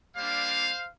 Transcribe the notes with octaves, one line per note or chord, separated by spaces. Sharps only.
G3 A#3 D4 C5 F5